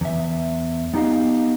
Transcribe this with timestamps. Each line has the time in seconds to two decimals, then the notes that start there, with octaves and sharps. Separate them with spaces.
0.01 E2 E5
0.94 B3 D#4 G4 D#5 F5